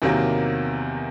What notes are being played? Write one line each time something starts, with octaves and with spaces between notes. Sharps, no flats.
E2 C3 D#3 F#3 A#3